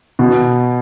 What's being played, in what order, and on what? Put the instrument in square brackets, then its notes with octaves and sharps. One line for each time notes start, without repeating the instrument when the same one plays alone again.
[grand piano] B2